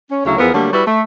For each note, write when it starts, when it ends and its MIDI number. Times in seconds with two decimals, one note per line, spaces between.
0.11 0.25 61
0.25 0.36 38
0.25 0.36 49
0.25 0.36 54
0.25 0.36 61
0.25 0.36 64
0.38 0.53 40
0.38 0.53 53
0.38 0.53 59
0.38 0.53 68
0.38 0.53 70
0.54 0.70 50
0.54 0.70 54
0.54 0.70 55
0.54 0.70 57
0.54 0.70 58
0.73 0.87 55
0.73 0.87 64
0.73 0.87 66
0.73 0.87 71
0.87 1.02 57